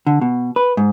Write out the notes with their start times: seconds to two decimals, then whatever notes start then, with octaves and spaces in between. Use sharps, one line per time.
0.07 D3
0.21 B2
0.56 B4
0.77 G#2